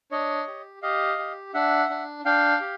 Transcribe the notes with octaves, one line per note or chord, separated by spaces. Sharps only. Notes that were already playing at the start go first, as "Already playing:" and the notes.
D4 C#5 D#5
G4
G4 D#5 F5
G4
D4 E5 F#5
D4
D4 F5 G5
G4